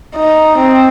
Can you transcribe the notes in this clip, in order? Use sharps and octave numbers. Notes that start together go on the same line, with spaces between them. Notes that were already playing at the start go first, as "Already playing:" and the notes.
D#4
C4